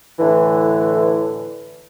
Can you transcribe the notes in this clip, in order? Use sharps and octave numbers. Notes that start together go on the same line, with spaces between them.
A2 D3 E3